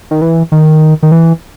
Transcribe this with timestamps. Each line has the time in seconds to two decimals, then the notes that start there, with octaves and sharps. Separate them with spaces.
0.11 D#3
0.22 E3
0.52 D#3
1.03 D#3
1.12 E3